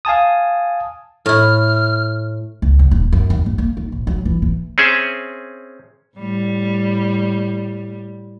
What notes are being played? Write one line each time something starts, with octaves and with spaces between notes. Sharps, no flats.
F5 G#5 A5 D#6
A2 E4 F6
C#2
C#3
D#1
F#2
D#2
F#2
A#3
D#3
A#1
F#3
E3
E3
C4 C#4 G#4 E5
A2 G3